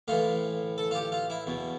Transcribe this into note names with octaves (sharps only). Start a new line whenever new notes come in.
A2 E3 F4
A4
F4
G4
F4
E4
E2 B2